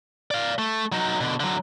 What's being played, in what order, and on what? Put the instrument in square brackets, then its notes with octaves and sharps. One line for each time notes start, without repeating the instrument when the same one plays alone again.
[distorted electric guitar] D5 F5
A3
F#3 D#4
B2 D3
D3 F#3